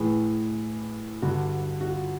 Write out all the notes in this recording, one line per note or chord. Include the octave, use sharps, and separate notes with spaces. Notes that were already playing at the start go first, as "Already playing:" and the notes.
Already playing: A2 E3 G#4
G2 D3 F#4
F#4
F4